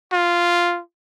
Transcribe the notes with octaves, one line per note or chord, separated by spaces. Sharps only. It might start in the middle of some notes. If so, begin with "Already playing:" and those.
F4